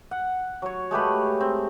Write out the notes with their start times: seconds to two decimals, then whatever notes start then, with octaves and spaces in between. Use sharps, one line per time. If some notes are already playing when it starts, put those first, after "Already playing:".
0.11 F#5
0.62 F#3 C#5
0.91 G#3 A3 G4 B4
1.41 C4